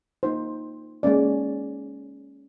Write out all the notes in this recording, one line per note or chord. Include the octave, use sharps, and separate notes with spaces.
A#3 D#4 C5
G#3 A#3 C#4 D5